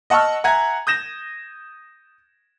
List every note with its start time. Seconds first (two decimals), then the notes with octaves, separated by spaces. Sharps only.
0.10 D#5 F#5 A5 C#6 E6 F6
0.44 E5 F#5 G#5 A#5 G#6
0.87 D#6 G6 A#6 E7